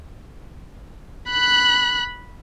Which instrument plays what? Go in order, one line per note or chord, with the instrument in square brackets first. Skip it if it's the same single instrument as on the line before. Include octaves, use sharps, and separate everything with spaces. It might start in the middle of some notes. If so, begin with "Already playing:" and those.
[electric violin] B5 F#6